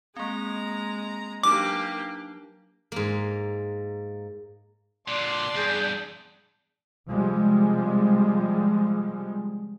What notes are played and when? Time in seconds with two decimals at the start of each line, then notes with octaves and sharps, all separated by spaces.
0.16 G#3 A#3 C4 A#5
1.43 F#3 A#3 D4 D#4 G4 D6
2.92 G#2 A#3
5.08 A#2 D3 D5 A5 C6
5.55 E2 G2 G#4 G6
7.08 C3 F3 G3 G#3